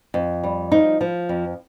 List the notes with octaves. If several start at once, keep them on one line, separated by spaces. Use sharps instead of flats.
F2
G3
F3 D#4
F3
F2